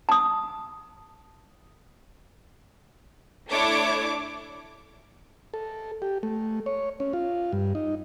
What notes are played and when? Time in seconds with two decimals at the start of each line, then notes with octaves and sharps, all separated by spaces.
0.09 A5 D#6
3.50 A3 D4 E4 C#5 D6
5.54 A4
6.02 G4
6.23 A3
6.66 C#5
7.00 C#4
7.13 F4
7.52 G2
7.75 D#4